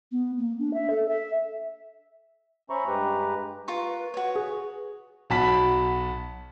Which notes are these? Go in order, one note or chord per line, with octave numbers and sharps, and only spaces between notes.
B3
A#3
D4
E5
A4
E5
C#4 C5 E5 A#5 B5 C#6
G2 G#3 G4 B4 A#5
F4 A#4 B4 C#6
F#4 B4 C#5
G#4
B1 F#4 A5 B5 B6